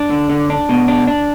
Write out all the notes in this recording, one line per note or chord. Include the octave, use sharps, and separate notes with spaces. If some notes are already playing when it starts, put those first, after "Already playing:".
Already playing: D4
D3
D3
D4
B2
D4
D4